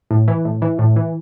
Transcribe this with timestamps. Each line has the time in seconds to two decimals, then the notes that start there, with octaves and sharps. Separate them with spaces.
0.11 A2
0.28 E3
0.45 A2
0.62 E3
0.79 A2
0.96 E3